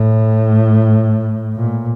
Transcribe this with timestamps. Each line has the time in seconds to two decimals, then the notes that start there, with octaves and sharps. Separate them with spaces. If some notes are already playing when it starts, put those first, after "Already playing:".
Already playing: A2
1.57 A#2